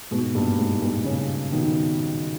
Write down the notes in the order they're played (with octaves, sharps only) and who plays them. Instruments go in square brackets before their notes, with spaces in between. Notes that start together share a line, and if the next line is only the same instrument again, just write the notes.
[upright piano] G#2 B2
G2 A#2
G#2
G2 A#2
A#2 C#3
B2 D#3